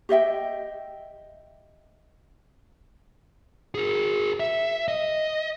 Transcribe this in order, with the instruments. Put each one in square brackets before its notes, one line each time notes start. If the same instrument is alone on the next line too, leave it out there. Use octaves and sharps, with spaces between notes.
[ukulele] G4 D#5 E5 G5
[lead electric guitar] G#4 A#4
E5
D#5